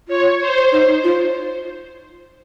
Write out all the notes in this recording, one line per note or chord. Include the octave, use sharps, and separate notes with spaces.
F4 C#5
C5
D#4
D#4
F4